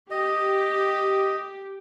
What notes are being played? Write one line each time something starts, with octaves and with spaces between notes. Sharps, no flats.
G4 D#5